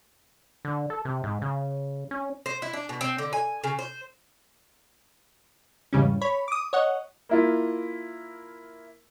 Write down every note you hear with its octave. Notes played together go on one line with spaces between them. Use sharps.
D3
A4
C3
G#2
C#3
C#4
C5
E4
D4
B2
C4
D3
G#5
C#3
C5
E2 G#2 C#3 G3 C#4
C#5 B5
D6 D#6
C#5 D#5 F#5
A#3 E4 F4